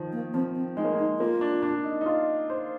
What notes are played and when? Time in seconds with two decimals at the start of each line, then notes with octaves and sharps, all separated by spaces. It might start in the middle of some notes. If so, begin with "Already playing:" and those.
Already playing: D#3 F3
0.12 A#3
0.34 F3 C4
0.55 C4
0.77 G#3 D#4
0.85 A#3
0.93 G#3
0.99 D#4
1.20 A#3 F4
1.41 D4
1.63 D4
1.84 D#4
2.01 D#4
2.06 F4
2.50 C5